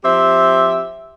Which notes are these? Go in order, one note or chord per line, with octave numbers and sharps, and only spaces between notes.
F3 C4 G4 E5